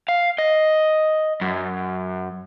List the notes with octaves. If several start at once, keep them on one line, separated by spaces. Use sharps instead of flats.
F5
D#5
F#2